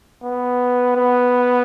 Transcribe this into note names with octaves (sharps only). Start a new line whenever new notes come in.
B3
B3